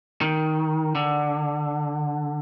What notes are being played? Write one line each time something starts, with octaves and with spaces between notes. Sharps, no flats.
D#3
D3